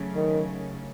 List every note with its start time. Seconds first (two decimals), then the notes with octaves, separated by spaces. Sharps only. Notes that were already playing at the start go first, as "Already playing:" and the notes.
Already playing: C#3 F#3 A3 C#4
0.15 D#3